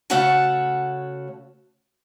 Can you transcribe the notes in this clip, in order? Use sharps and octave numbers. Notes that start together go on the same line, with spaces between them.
C#3 A3 F#4 C#5 F#5 A5